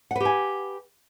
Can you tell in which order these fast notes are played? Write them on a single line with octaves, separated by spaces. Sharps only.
F#5 B4 G4 G#5